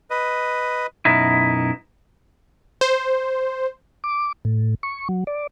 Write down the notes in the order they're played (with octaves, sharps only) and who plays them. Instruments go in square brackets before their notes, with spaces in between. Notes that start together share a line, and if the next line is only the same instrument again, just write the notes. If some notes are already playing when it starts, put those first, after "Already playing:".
[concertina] B4 D#5
[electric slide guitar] F#2 B2 D#4 E4
[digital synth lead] C5
[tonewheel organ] D6
A2
C#6
F#3
D5